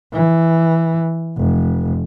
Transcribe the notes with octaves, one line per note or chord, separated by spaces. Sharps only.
E3
F1